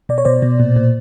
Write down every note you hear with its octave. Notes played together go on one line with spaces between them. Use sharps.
B2 D5
C#5
B2 C5 D5
B2
A#2
A#2